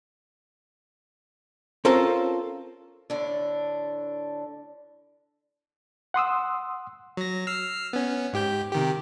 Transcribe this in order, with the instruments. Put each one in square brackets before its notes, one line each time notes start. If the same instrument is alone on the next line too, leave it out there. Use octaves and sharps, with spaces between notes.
[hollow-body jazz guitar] C4 C#4 F4 A4 A#4 C5
[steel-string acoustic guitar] A2 D3 D4
[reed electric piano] F#5 C6 D#6 E6
[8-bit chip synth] F#3 A#6
E6 F6 C7
B3 C#4
G#2 G4 G6
C3 D#3 G4